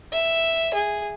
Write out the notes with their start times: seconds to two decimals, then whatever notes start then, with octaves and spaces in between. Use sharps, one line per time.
0.12 E5
0.74 G#4